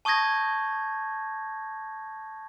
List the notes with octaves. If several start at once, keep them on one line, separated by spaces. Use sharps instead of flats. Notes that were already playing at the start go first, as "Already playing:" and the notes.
A5 C#6 D#6 G6 G#6 A#6